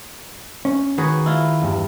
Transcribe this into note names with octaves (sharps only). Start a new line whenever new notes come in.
C#4
D#3 F#4 G#4 B4
E4 F4
E2 G2